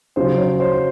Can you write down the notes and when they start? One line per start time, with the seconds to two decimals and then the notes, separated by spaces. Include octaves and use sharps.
0.16 C#3 F#3 C5
0.38 C#5
0.60 C5